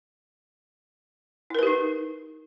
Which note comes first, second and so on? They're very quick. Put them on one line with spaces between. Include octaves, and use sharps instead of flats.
E4 A#4 B4 G4 D#4